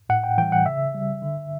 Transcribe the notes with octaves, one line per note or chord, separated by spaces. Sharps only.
A2 F#5
G5
E3 G3 G5
F#5
C#3 E5
G3
D3